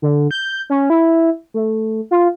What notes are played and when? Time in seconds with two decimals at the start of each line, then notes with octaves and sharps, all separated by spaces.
0.02 D3
0.31 G6
0.70 C#4
0.90 E4
1.54 A3
2.11 F4